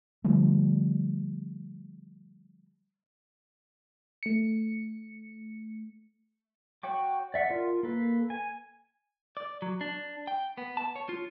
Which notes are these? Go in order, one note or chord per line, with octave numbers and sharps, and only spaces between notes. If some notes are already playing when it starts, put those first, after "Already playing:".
D3 F3 G3 A3
A3 C#7
F#4 C#5 G5 D6
D5 E5 F#5
F4 A#4
A#3 A4 B4
G#5
D5
F#3
D4
G5
B3
A5
C#5
F4